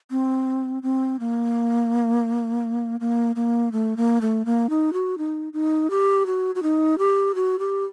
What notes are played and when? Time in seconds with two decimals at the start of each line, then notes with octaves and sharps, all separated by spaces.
0.11 C4
0.83 C4
1.20 A#3
3.00 A#3
3.36 A#3
3.72 A3
3.97 A#3
4.21 A3
4.45 A#3
4.70 D#4
4.93 F#4
5.18 D#4
5.53 D#4
5.90 G4
6.26 F#4
6.55 F#4
6.63 D#4
6.98 G4
7.35 F#4
7.59 G4